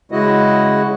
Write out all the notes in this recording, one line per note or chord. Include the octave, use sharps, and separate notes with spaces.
C#3 G#3 E4 F#4 D#5